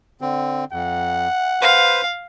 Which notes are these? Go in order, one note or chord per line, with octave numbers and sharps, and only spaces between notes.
D3 C4
F2 F#5
B4 C5 F5